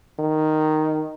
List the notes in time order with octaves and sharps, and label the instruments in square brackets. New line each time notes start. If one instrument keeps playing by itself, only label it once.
[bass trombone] D#3